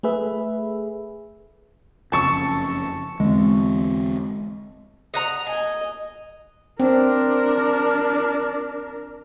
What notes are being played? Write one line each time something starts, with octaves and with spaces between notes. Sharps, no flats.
A3 G#4 B4 E5
F#1 F2 C#3 A5 C#6 E6
E2 D3 G#3 C4
D#5 F#5 A#5
D#5 G#5
C4 D4 A#4